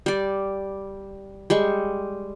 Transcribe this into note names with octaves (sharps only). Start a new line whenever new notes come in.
G3 D5
G3 G#3 C#6